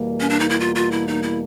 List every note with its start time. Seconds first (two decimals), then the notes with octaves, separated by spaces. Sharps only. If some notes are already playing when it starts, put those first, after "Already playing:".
Already playing: E2 B2 G3 A#3
0.20 C#4
0.29 D4
0.40 D#4
0.49 E4
0.60 F4
0.75 F4
0.91 E4
1.07 D#4
1.22 E4